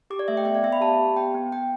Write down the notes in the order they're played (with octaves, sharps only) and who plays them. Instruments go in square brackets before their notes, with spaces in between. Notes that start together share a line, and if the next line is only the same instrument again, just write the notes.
[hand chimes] G4 D6
D5
A3 E5
G5
B3 E5
D5
B3 E5
B5
G4 A5
G4
B3 G5
B3
B3 G5